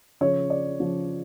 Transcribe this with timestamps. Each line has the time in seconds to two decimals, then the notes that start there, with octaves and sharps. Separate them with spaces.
0.21 C#3 F3 C#5
0.50 D5
0.79 C#3 F3